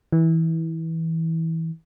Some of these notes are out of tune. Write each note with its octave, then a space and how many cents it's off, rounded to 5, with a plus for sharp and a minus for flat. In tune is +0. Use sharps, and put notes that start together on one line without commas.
E3 -20